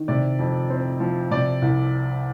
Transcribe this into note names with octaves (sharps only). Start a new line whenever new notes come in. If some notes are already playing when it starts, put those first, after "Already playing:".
Already playing: D#3
C3 D5
F2
C4
F3
C3 D5
C2